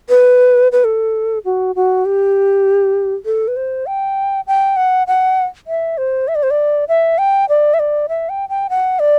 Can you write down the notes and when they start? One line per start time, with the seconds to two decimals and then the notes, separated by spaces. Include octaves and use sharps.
0.09 B4
0.72 B4
0.84 A4
1.45 F#4
1.75 F#4
2.05 G4
3.26 A4
3.48 B4
3.56 C5
3.86 G5
4.47 G5
4.76 F#5
5.07 F#5
5.67 E5
5.98 C5
6.28 E5
6.35 D5
6.43 C5
6.51 D5
6.88 E5
7.18 G5
7.49 D5
7.74 E5
7.79 D5
8.09 E5
8.29 G5
8.49 G5
8.70 F#5
8.99 D5